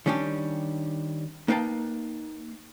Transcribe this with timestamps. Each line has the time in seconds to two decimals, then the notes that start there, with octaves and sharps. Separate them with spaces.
0.06 D#3 G3 C#4 D4 G4
1.48 A#3 D#4 B4 F5 G5 A5